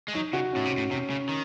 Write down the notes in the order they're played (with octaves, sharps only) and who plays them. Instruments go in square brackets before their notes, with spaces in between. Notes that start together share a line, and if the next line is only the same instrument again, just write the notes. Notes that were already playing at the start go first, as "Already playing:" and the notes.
[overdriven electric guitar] G#3
[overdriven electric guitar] F#3 [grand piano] D#4
[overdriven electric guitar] C#3 [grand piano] F#4
[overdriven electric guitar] A2 [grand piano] C#4
[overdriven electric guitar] C3
A2
[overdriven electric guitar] C3 [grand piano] C#4
[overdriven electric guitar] C#3
D#3